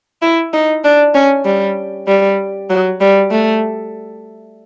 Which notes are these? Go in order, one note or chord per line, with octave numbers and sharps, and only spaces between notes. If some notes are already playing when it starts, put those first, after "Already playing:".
E4
D#4
D4
C#4
G3
G3
F#3
G3
A3